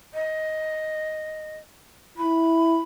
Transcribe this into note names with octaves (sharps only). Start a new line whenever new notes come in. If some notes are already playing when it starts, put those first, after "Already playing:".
D#5
E4 B5